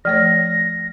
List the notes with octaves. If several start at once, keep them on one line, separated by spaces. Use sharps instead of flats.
F3 A3 C#5 F6 A#6